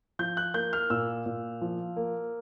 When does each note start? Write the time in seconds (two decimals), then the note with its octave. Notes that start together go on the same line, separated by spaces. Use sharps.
0.19 F3 G6
0.37 F#6
0.54 A#3 G6
0.73 F6
0.90 A#2 E6
1.26 A#2
1.61 F3
1.97 A#3